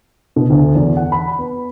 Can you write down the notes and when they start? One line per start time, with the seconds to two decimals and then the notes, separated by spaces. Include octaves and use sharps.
0.36 B2
0.50 D2
0.75 E2
0.97 F#5
1.12 B5
1.38 B3